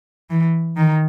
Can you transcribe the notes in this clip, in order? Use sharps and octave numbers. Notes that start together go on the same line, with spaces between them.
E3
D#3